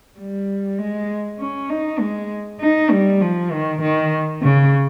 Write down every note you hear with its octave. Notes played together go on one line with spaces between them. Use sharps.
G3
G#3
C#4
D#4
G#3
D#4
G3
F3
D#3
D#3
C#3